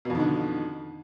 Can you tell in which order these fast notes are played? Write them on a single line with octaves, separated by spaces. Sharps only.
B2 F2 D#3 D3